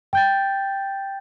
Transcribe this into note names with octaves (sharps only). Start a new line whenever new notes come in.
G5 G6 A6